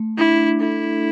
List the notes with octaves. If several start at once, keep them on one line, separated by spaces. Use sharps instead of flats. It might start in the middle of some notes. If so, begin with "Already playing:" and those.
Already playing: A3
D4 E4
E4 A4